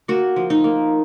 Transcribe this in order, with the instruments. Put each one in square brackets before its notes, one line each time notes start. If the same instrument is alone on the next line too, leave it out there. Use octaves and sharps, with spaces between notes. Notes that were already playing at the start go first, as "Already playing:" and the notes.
[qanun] A#3 F#4
F3
D#4
A#3